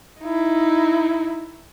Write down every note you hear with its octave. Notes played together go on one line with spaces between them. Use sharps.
D#4 E4